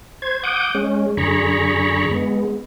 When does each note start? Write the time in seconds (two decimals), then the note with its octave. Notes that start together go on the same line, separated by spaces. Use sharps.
0.22 C5 G#6
0.43 F#5 D6 D#6 G6
0.75 G#3 C#4
1.17 F#2 D3 G#4 A#5 B5 C#6
2.11 G#3 B3